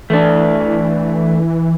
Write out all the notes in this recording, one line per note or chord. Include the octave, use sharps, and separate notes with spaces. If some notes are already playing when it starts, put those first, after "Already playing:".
E3 A3 D4